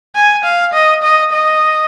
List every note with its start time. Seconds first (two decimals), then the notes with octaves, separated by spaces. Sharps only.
0.15 G#5
0.44 F5
0.73 D#5
1.03 D#5
1.32 D#5